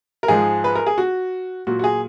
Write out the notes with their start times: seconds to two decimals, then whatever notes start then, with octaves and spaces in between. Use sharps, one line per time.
0.23 A#4
0.28 G#2 F3 G#3 G#4
0.64 B4
0.75 A#4
0.87 G#4
0.98 F#4
1.67 A#2 F#3 F#4
1.79 F#4
1.84 G#4